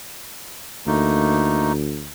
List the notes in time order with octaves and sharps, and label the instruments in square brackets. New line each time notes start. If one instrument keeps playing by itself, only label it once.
[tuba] D2 [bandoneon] A3 A#3 D#4